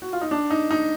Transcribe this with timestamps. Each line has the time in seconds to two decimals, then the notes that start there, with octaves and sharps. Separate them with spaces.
0.02 F#4
0.13 F4
0.21 D#4
0.31 D4
0.50 D#4
0.71 D#4